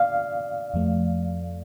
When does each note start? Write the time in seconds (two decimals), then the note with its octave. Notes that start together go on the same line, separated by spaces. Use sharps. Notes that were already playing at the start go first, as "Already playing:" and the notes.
Already playing: D5 F5
0.74 F2 F3 A3